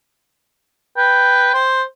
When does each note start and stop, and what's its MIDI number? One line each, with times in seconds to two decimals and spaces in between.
0.97 1.51 71
0.97 1.61 79
1.54 1.83 72